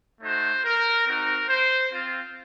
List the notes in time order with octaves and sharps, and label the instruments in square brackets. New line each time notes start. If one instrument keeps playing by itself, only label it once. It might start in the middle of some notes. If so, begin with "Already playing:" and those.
[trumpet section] A3 D#4 F#4 C5
A#4
C4 D#4 F#4 A#4
C5
C4 F4